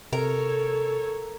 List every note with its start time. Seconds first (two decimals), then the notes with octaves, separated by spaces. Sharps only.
0.13 C3 A4 A#4 C#5